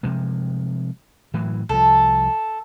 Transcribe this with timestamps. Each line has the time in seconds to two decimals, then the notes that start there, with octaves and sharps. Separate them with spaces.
0.03 C3 F3 G#3
1.34 A2 E3 F#3
1.69 C2 F3 A4